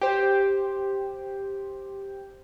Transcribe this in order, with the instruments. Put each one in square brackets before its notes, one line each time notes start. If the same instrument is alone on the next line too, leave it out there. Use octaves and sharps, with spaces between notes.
[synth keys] G4 C5